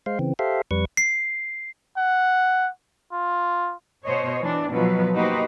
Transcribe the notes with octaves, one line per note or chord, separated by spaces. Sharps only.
G#3 C5 F5
C#3 E3 C4
G4 A4 C5 E5 F5
F2 G3 B4 C#6
C7
F#5
F4
B2 C5 C#5 D#5
E3 D4
B2 F3 F#3 B4
A#3 D#4 F#4 G4 B4 C5